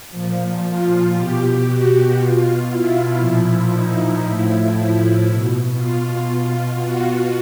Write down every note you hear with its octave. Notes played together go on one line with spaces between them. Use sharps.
A#2 F3
F4
B2 G4
F#4
B2 F4
E4
A#2 F3
D#4
A2 F3 E4
B2
F4
B2
F#4